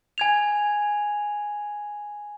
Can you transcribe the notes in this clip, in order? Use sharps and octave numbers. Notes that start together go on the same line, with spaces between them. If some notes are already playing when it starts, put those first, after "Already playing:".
G#5 G#6 F7